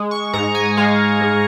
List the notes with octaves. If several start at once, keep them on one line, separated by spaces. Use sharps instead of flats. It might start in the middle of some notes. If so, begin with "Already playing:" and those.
Already playing: G#3
C#6
G#2 A#5
G#5
G#3 F5
G#2